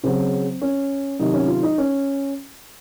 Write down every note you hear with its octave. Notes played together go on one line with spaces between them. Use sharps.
C#3 F#3 C4
C#4
C3 D#3 F#3 D#4
C#4
F4
D#4
C#4